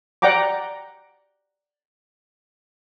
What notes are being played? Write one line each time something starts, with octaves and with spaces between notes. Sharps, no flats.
D5 F#5 G5 A#5 D6